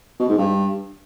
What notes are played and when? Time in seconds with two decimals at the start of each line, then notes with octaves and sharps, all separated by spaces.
0.20 B2
0.29 G#2
0.38 G2